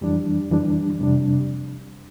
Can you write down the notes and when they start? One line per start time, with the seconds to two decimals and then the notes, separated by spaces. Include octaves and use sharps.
0.01 F2 E3 G3 D4
0.50 F2 E3 G3 D4
0.99 F2 C3 G3 D4